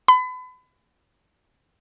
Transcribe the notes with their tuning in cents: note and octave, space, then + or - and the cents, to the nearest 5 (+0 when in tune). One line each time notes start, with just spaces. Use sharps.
B5 +35